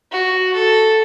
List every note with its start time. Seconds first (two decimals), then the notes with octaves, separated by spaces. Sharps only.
0.12 F#4
0.54 A4